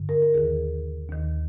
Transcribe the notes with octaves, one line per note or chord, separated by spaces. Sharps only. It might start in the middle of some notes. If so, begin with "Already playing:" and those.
Already playing: G2 D3
A#4
A#4
D#2 D#3 G#4
D#2 D#3